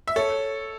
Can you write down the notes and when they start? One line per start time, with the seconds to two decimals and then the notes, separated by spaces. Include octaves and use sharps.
0.08 E5
0.16 A4 C#5